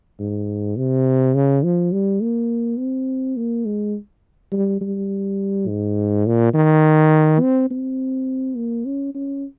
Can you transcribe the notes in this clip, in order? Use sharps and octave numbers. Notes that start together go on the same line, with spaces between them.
G#2
C3
C#3
F3
G3
A#3
C4
A#3
G#3
G3
G3
G#2
A#2
D#3
C4
C4
A#3
C#4
C#4